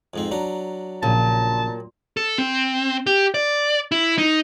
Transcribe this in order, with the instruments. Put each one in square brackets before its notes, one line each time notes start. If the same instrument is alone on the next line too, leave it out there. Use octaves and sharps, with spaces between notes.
[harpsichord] F2 G#2 C4
F#3 D4 A#5
[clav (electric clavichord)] A#1 C#3 [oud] A#2 [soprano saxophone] A5
[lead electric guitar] A4
C4
G4
D5
E4
D#4